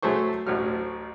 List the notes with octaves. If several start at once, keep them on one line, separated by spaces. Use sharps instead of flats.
F#3 A3 G#4 C5 C#6
A1 D2 A2 F#3 F6